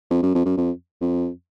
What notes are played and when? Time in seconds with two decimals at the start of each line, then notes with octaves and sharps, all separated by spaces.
0.10 F2
0.23 F#2
0.35 F2
0.46 F#2
0.57 F2
1.01 F2